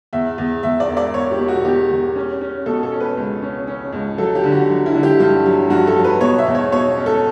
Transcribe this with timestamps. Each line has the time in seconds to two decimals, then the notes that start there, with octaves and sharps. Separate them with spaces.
0.13 E2 E5
0.38 E2
0.63 E2 E5
0.80 D5
0.89 E1
0.97 D5
1.14 E2 C#5
1.31 G4
1.39 B2
1.48 F#4
1.65 E2 G4
1.90 E2
2.16 C#4
2.41 C#4
2.66 B2 A4
2.83 A4
2.92 C#4
3.00 B4
3.17 C#2
3.42 C#4
3.67 C#4
3.93 C#2
4.18 F#3 A4
4.35 G4
4.44 D3
4.52 F#4
4.70 F#3
4.86 E4
4.94 D3
5.03 G4
5.20 G2 G4
5.46 F#3
5.70 G2 F#4
5.87 A4
5.96 F#3
6.04 B4
6.21 B2 C#5
6.38 E5
6.47 E2
6.55 C#5
6.72 B2 C#5
6.97 C#4
7.06 A4